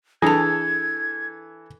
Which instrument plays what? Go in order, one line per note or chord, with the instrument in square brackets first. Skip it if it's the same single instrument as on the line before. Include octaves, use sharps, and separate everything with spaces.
[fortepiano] E3 A4 [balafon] D4 A5 [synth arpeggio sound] G#4 [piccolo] G#6